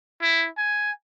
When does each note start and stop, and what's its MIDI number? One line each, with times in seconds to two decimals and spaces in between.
0.21 0.48 64
0.58 0.91 80